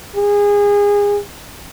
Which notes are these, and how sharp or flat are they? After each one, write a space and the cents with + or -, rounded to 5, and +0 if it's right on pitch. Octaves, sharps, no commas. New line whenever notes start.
G#4 -25